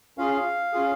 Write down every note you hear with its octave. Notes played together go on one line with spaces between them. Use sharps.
C#4 F4 G#4 F5
C#4 F4 G#4